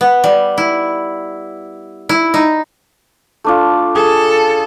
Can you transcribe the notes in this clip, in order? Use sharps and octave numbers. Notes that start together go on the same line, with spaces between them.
B3
G3
E4
E4
D#4
A3 D4 F4
G#4 A4 A5